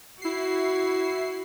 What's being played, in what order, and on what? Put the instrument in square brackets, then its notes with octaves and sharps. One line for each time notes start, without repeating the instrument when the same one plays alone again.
[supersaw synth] E4 C7 [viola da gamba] F#4